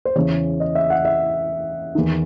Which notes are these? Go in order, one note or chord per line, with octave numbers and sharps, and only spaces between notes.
C5
E2 C#3 E3 C#5
D#5
E5
F#5
E5
E2 D#3